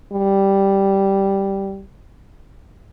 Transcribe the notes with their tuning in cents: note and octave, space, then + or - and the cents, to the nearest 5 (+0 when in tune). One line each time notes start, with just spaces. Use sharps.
G3 -5